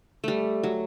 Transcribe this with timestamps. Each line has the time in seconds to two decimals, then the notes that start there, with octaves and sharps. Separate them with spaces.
0.24 G3 A3
0.63 F#3